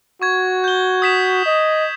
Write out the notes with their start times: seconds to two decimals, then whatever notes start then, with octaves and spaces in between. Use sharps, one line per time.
0.22 F#4 C#6 G#6
0.64 G6 G7
1.02 D#6 B6 E7
1.45 D#5